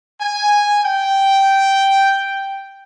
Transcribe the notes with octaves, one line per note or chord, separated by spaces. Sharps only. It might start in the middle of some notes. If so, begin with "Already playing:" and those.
G#5
G5